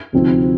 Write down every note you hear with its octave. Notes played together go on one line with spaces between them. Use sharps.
D2 C3 F3 C4 D#4